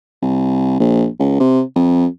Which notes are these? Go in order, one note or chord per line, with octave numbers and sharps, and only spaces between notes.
C2
A#1
C#2
C3
F2